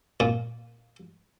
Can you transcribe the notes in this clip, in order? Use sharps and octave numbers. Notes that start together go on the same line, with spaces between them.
A#2